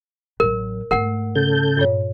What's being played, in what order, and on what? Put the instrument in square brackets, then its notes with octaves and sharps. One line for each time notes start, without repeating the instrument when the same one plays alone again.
[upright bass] A1 F#3 [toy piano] A#4
[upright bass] G#2 A3 [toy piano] A#4 F#5
[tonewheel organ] C#3 A4 G6
[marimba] G2 A#2 C#5